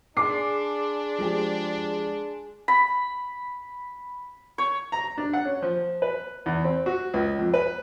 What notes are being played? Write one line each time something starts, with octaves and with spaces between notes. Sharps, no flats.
D4 G#4 G#5 C6 D6 C7
F3 G#3 G4
B5
C#5
A#5
D4
F#5
C#4
F3
B4
E2
C4
F#4
C#2
F2
B4